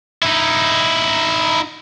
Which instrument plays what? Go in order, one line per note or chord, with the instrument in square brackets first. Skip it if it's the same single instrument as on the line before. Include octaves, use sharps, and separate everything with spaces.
[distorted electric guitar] D#4 E4